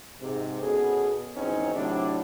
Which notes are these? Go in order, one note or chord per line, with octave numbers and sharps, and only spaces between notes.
G#2 C3
B2 B3 C#4 G#4 A4
G#1 E2 C4 C#4 D#4
A2 C3 F#3 D4